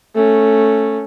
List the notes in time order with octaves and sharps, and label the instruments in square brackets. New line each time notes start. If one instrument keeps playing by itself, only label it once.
[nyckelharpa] A3 C#4